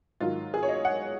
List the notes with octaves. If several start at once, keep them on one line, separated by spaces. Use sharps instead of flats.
G#2 D#3 F#3 F4
G#4
C#5
D#5
F#5